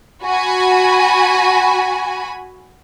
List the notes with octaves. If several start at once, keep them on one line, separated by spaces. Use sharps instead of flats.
F#4 G#5 B5